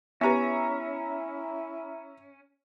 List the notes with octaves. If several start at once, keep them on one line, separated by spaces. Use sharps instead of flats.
B3 C#4 E4 G4 B4 E5 A#5